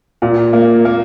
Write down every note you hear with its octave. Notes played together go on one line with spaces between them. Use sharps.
A#2
A#3
A#3